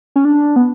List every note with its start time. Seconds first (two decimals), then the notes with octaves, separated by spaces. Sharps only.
0.16 C#4
0.25 D4
0.56 B3